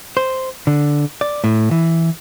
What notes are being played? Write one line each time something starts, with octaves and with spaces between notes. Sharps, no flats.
C5
D3
D5
A2
E3